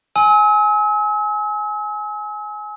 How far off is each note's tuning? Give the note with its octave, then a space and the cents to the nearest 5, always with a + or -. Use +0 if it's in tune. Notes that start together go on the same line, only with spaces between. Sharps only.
G#5 +15 E6 -45